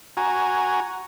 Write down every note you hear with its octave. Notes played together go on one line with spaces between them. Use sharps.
F#4 G#5 A#5